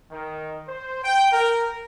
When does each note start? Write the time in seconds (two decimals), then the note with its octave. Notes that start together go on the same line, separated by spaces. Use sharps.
0.12 D#3
0.68 C5
1.04 G5
1.33 A#4